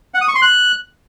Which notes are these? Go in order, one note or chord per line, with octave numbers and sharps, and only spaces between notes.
F#5
D#6
C#6
C6
F#6